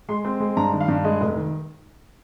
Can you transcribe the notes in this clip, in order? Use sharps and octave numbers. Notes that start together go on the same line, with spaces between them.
G#3 C6
C4
G#3
G2 A#5
D#3
F5
G2
G#3 D#5
F1
D#3